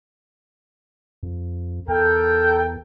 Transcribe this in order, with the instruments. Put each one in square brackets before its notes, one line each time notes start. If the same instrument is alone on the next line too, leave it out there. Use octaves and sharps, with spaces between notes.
[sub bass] F2
[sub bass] E2 [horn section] A4 A#4 G5